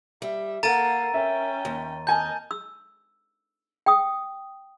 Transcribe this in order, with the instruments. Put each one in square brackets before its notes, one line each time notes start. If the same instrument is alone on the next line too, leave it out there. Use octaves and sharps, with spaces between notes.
[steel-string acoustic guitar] G3 [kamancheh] E5
[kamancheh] A#3 F#5 [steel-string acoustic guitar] A4 A#4 [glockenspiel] A#5 A6 D#7
[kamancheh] C#4 G5 [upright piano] E5
[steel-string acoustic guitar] D#2
[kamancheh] A#4 D#5 [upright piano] G#5 A5 [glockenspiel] G6
[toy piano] E6
G5 D#6